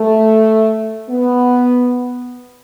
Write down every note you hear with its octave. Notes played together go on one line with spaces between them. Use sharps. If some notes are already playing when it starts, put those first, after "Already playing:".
Already playing: A3
B3